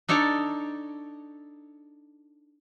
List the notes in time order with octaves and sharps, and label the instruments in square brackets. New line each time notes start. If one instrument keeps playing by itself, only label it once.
[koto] D4 D#4 A4 C#5 D5